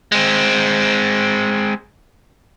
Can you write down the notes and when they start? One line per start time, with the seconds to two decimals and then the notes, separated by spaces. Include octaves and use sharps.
0.12 G#3 C4